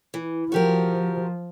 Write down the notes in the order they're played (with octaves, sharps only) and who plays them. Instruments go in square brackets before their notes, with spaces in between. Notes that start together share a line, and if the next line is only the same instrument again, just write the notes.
[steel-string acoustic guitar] E3
[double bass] F3 [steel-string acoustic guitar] F#4 G4 A#4